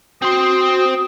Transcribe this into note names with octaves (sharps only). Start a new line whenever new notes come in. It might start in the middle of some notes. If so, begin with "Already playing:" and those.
C4 F#4 C5 D#6